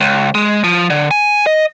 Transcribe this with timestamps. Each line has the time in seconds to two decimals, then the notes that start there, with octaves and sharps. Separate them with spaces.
0.01 C#2
0.35 G#3
0.64 F3
0.90 D3
1.11 G#5
1.47 D#5